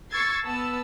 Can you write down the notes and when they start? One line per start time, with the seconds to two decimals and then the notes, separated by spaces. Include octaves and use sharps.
0.10 C#6 E6 G#6 A6 C7
0.45 B3 A5 E6